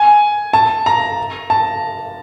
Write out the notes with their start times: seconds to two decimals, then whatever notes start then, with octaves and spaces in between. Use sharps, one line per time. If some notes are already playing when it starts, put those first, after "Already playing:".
Already playing: G#5
0.53 A5
0.86 A#5
1.50 A5